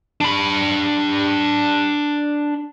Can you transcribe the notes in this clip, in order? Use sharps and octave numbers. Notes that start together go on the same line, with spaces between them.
D4 B5